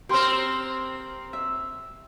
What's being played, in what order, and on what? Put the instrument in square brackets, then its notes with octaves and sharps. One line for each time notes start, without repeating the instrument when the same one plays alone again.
[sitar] A#3 C4 [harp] G4 C6 F6
[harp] E5